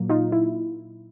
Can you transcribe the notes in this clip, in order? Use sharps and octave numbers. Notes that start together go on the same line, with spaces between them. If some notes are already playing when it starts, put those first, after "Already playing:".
Already playing: A#2 F#3 A#3
D#4 F4
E4